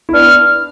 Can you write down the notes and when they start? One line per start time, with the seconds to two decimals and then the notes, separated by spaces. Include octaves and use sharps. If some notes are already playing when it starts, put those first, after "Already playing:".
0.09 E4
0.13 B3 D4 F6